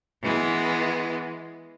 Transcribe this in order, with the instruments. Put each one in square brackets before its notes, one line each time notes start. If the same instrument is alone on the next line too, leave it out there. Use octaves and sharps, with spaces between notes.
[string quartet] E3 G#3 B3